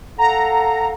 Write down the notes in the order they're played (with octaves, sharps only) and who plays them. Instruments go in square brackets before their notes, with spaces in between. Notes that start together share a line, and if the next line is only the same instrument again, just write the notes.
[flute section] A4 F5 F#5 [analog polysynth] A#5